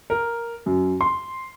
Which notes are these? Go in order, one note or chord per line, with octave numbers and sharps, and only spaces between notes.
A#4
F#2
C6